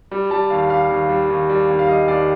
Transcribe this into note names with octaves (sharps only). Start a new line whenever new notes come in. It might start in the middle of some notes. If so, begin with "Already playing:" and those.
G3
G3 A5
D#2 F5
G3 F5
D#2
G3
D#2
G3
D#2
F5
G3 D#5
D#2 D5